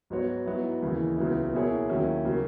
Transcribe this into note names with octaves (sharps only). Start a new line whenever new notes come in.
G#2 F#3 B3 F#4 C#5
G#2 F#3 B3 E4
D#2 C#3 E3 G#3
C#2 C#3 F#3 B3 E4
B2 A#3 E4 G#4 C#5
D#2 D#3 F#3 C#4 E4
C#3 F#3 A#3